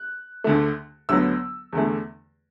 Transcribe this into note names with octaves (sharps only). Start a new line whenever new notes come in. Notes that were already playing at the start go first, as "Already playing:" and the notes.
Already playing: F#6
D2 D3 A3
D2 D3 F#3 B3 E6
E2 D3 A3